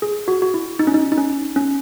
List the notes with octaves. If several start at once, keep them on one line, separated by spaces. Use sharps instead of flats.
G#4
F#4
F#4
E4
D#4
C#4
D#4
D#4
C#4
C#4